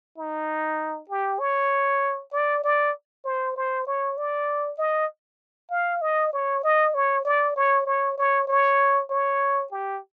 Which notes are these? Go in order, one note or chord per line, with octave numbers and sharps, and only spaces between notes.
D#4
G4
C#5
D5
D5
C5
C5
C#5
D5
D#5
F5
D#5
C#5
D#5
C#5
D5
C#5
C#5
C#5
C#5
C#5
G4